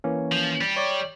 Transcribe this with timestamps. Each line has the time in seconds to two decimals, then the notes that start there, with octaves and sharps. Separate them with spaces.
0.04 E3 A#3 C#4
0.32 F3
0.61 G3
0.76 C#5 D5